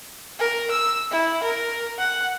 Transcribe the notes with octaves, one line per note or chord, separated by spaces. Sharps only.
A#4
E6
E4
A#4
F#5